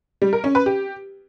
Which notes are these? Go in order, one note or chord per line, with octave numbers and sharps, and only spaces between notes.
G3
A#4
C#4
B4
G4